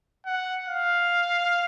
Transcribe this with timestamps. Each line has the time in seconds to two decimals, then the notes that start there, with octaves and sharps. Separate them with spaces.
0.26 F#5
0.68 F5